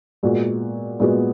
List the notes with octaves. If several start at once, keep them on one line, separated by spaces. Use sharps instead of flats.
A#2 G#3 B3 F#4
A#2 G#3 B3 F#4